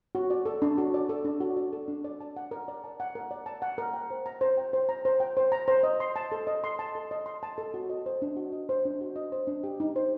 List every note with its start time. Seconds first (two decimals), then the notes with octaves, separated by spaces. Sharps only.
0.15 F#4
0.30 D5
0.45 A4
0.62 D4
0.78 F#4
0.94 D5
1.09 A4
1.25 D4
1.40 F#4
1.57 D5
1.73 A4
1.88 D4
2.04 D5
2.21 A5
2.37 F#5
2.51 A#4
2.68 D5
2.84 A5
3.00 F#5
3.15 A#4
3.31 D5
3.46 A5
3.62 F#5
3.78 A#4
3.94 G5
4.11 C5
4.26 A#5
4.41 C5
4.57 G5
4.73 C5
4.89 A#5
5.05 C5
5.20 G5
5.37 C5
5.52 A#5
5.68 C5
5.83 D#5
6.00 C6
6.16 A5
6.32 A4
6.47 D#5
6.64 C6
6.79 A5
6.95 A4
7.11 D#5
7.26 C6
7.43 A5
7.58 A4
7.74 F#4
7.90 D#5
8.06 C5
8.22 D4
8.36 F#4
8.52 D#5
8.69 C5
8.85 D4
9.01 F#4
9.16 D#5
9.32 C5
9.47 D4
9.64 G4
9.80 D#4
9.96 C5